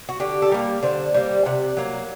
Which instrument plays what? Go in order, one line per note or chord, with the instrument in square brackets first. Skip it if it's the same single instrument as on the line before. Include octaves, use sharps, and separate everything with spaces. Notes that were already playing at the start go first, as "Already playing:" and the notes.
[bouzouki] F#4
D3 G4
A4
G3 A#3 A#4
D3 C5
G3 A#3
C3 F#5
F#3 A#3